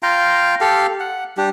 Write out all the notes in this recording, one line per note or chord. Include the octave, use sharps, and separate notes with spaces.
F4 F5 G5 A#5
G4 A4 F5
F#5
G3 D4 G4